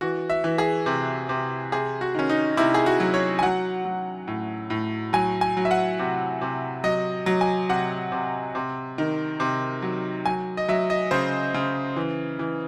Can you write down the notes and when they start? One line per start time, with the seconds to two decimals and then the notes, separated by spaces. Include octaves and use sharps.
0.01 E3 F#4
0.30 E5
0.44 E3
0.58 G#4
0.86 C3
1.29 C3
1.72 C3 G#4
2.01 F#4
2.15 D#3 C#4
2.29 D#4
2.57 C3 E4
2.74 G#4
2.86 F#4
3.00 F#3
3.14 C#5
3.39 G#5
3.43 F#3 F#5
3.85 F#3
4.28 A2
4.70 A2
5.13 F#3 G#5
5.41 G#5
5.57 F#3
5.65 E5
5.71 F#5
5.99 C3
6.41 C3
6.84 F#3 D#5
7.26 F#3
7.41 G#5
7.69 C3 F#5
8.12 C3
8.55 C3
8.98 D#3
9.40 C3
9.82 F#3
10.26 F#3 G#5
10.57 D#5
10.68 F#3 E5
10.90 D#5
11.11 C#3 C5
11.54 C#3
11.96 E3
12.39 E3